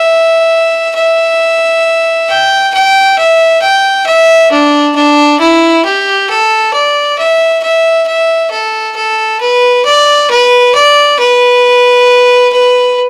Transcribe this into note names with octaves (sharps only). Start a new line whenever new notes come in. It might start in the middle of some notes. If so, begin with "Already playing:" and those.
Already playing: E5
E5
G5
G5
E5
G5
E5
D4
D4
E4
G4
A4
D5
E5
E5
E5
A4
A4
B4
D5
B4
D5
B4
B4